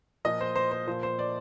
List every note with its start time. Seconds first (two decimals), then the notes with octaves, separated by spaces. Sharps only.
0.25 A#2 F3 D#5
0.41 C5
0.56 C5
0.72 C5
0.88 A#2 F3 C5
1.03 C5
1.19 D5